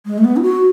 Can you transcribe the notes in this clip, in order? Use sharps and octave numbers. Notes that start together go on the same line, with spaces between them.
G#3
A3
B3
E4
F#4